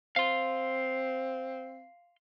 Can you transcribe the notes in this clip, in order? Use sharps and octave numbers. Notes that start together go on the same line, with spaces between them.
C4 F5 C6